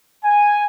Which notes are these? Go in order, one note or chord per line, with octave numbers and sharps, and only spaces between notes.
G#5